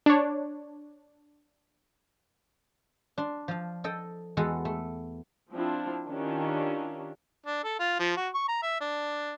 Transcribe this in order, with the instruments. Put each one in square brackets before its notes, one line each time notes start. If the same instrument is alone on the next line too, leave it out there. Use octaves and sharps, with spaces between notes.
[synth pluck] D4 C#5
[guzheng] D4 C6
F3 F5
A4 D#5 G5
E2 G#3 B3 F#4 A4
A3
[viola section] F3 C4 D4 E4 F4
D#3 C#4 D4 E4 F4 G4
[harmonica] D4
A4
F4
F3
F#4
C#6
A#5
E5
D4